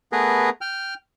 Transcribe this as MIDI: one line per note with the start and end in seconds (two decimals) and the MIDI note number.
0.12 0.50 57
0.12 0.50 59
0.12 0.50 68
0.12 0.50 70
0.12 0.50 71
0.61 0.94 79
0.61 0.94 89